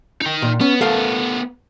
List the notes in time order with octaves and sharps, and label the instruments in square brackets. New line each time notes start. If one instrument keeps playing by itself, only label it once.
[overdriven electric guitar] D#4 G5
[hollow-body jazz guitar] A#2
[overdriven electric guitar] B3 [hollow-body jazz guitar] C#4
[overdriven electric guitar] A3 B3 [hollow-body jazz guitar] A4 F5